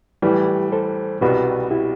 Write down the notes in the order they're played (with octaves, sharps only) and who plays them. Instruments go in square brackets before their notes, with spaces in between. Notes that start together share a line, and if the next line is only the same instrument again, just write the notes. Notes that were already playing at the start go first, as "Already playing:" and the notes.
[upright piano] A2 E3 G3 [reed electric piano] G4 B4
[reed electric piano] A4 C5
[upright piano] C2 B2 G3 B3 F#4 [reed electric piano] G4 B4
[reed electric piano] E4 G4